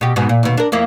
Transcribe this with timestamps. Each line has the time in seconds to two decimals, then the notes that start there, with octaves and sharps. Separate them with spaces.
0.01 B2 G4
0.16 G#2 B2
0.29 A#2
0.43 D#2 B2
0.57 D4 A#4
0.72 F2 A#3 E4